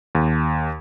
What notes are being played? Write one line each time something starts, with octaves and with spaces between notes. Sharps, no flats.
D#2